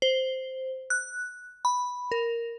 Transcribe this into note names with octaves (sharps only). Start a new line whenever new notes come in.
C5
F#6
B5
A#4